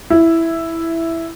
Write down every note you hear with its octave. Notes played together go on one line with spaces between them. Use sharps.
E4